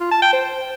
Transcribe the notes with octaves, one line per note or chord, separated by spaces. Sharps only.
F4
A5
G5
C5